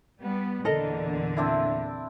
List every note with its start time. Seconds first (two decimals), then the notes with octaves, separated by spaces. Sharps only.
0.21 G3 B3
0.65 E2 A#2 D3 A4 A#4 D#5
1.37 C4 D4 E4